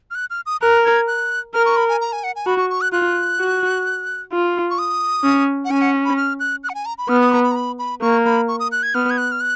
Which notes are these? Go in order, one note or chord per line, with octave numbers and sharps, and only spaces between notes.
F6
F#6
F6
D#6
A#4 F#6
G#6
F#6
A#4 F6
C#6
B5
G#5
A#5
G#5
F#5
G#5
F#4 B5
C#6
C#6
F#6
F4 F#6
F#4
F4
C#6
D#6
C#4
F#5
C#4 G#5
F#5
B5
F6
F#6
F#6
F#5
G#5
A#5
B5
B3 F6
D#6
A#5
B5
A#5
B5
B5
A#3 C#6
B5
C#6
D#6
F#6
G#6
B3 F6
G#6
F#6
F6
F#6